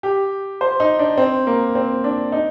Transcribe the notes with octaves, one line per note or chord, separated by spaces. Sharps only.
G4
C5
D#4
D4
C4
A#3
C4
D4
D#4